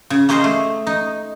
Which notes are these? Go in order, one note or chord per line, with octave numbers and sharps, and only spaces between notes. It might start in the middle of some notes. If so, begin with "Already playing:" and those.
C#3
A#3 C#4 G#4 C5 D#5
A3
D#4